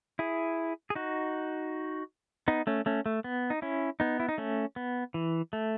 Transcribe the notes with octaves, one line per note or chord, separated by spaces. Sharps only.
E4 G#4
G#4
D#4 F#4
B3 D#4
A3 C#4
A3 C#4
A3
B3
D#4
C#4 E4
B3 D#4
E4
D#4
A3 C#4
B3
E3
A3